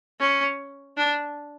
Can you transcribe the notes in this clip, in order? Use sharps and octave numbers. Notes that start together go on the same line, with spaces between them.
C#4
D4